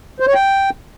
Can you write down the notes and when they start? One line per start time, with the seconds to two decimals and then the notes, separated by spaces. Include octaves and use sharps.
0.20 C5
0.27 C#5
0.34 G5